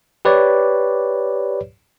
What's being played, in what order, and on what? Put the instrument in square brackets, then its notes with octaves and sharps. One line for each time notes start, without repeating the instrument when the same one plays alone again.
[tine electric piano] G4 B4 C#5 D5